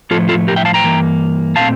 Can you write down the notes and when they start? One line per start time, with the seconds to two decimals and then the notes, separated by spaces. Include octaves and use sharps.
0.11 A2 F3 A3 F4 A4
0.29 F4 A4
0.48 G4 A#4
0.56 E5 G5
0.65 F5 A5
0.74 G5 A#5
0.83 G2 E3 A#3
1.56 A#2 A3 C4 F5 A5